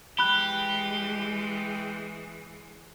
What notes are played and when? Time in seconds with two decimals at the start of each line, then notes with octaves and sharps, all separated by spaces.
0.19 E3 G#3 G4 B5 F#6